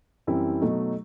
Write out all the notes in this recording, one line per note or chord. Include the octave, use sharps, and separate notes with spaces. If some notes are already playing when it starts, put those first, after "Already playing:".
F#2 E3 G3 C4 E4
B2 F#3 A3 D#4